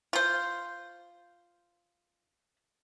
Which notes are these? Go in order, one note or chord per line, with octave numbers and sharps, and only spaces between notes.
F4 C5